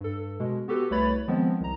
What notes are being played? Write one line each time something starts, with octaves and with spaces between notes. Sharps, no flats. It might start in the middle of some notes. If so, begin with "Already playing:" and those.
G2 A4
B2 G#3
B3 F#4 G4 A4 B4
C2 A3 B4 C#5 B5 A6
D#3 F3 G#3 B3 C4
C2 A#5